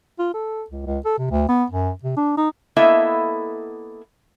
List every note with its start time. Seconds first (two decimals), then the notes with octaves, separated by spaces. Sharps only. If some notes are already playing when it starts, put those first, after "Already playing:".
0.19 F4
0.34 A4
0.70 C#2
0.86 C#2
1.05 A4
1.18 C3
1.31 D2
1.49 B3
1.70 F#2
2.03 C3
2.16 D4
2.37 D#4
2.76 A#3 B3 E4 A4 D#5 E5